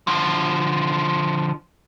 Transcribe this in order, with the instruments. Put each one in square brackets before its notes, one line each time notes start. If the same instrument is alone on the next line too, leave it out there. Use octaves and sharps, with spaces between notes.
[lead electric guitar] D3 F3